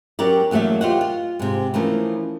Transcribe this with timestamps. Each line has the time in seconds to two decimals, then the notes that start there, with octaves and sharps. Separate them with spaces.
0.19 F#3 C#4 G4 A#4 D5
0.51 E2 F#3 A3 A#3 E5
0.81 F4 G4 C5 C#5 D#5 F#5
1.01 F4
1.39 G#2 C3
1.74 E3 F3 A3 C#4 A#4